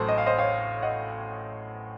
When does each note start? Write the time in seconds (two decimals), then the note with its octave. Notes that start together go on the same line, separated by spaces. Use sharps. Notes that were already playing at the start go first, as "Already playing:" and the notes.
Already playing: A1 A2 F#3 A3 A4 C5
0.08 D#5
0.18 F5
0.26 C5 D#5
0.38 C#5 F5
0.82 D#5 F#5